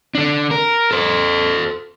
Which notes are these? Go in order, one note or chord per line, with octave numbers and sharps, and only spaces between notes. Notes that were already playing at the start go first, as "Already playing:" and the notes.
D3 D4
A#4
A4 C5